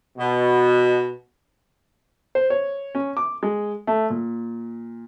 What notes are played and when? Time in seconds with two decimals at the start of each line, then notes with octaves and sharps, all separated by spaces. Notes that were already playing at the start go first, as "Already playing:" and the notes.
0.18 B2
2.35 C5
2.50 C#5
2.95 C#4
3.17 D6
3.43 G#3
3.87 A3
4.10 A#2